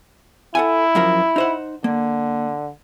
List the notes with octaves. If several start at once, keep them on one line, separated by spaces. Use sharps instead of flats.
E4 A4 F#5 G#5
F#2 F3 A#4
D#4 C5 F#5
D3 A#3